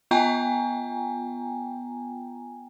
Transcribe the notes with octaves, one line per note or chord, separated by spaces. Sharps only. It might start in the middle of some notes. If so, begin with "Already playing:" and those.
B3 F4 G5 G#5 A#5